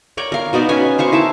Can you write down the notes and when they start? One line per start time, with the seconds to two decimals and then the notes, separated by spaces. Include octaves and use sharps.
0.17 A#4 C#5 D5 G5
0.32 A#4 F5
0.53 B2 B3 D#4 D5
0.69 C#4 B4 C#5 G#5
0.98 B4 C5 F5 C#6
1.12 D#4 E4 A#4 A5